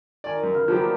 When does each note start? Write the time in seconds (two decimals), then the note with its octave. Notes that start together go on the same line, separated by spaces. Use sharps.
0.24 D#3 D5 G#5
0.43 F#2
0.54 C#3 B4 F5
0.68 F3 F#3 A#3 B3 D4 G4